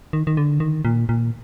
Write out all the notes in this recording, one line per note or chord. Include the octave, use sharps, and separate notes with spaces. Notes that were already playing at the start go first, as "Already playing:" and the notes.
D#3
D#3
D3
D#3
A#2
A#2